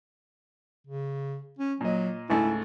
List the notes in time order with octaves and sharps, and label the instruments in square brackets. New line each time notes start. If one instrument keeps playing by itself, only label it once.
[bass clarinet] C#3
C#4
[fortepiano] A#2 D#5 [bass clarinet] F#3
[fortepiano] C#2 G#2 A3 [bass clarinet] E4